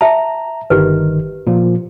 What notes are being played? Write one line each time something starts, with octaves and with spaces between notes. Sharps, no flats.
E5 A5 A#5
G1 D#3 G4 B4
A#2 F3